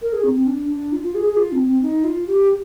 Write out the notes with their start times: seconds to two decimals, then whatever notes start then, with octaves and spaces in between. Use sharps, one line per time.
0.02 A#4
0.13 G#4
0.24 C4
0.35 C4
0.47 D4
0.70 D4
0.92 F4
1.03 F4
1.15 G#4
1.26 G#4
1.37 F4
1.52 C4
1.67 C4
1.82 D#4
2.04 F4
2.28 G4